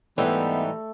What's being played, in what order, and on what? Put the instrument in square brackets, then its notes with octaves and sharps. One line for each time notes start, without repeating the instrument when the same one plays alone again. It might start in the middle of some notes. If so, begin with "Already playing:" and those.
[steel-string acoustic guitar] G#2 G3 D#4 [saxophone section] E3 [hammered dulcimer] A3 [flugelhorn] B3